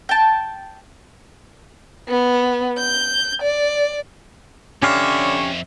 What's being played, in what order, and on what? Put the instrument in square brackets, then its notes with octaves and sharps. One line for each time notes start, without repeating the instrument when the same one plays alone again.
[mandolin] G5 A5
[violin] B3
G6
D5
[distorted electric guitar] F2 E5 [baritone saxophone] D3 [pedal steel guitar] C#4 G4 F5 [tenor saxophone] C#5